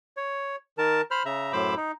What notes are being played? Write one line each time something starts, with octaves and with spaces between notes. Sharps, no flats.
C#5
D#3 A#4 A5
C5 B5 F6
C#3 E5 A#5
F#2 A2 C5 B5 D6 E6
D#4